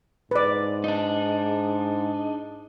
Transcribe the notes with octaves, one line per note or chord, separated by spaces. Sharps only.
G#2 B4 D5
D4 D#4